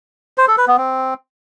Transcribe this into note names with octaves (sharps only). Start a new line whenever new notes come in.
C5
A4
B4
B3
C4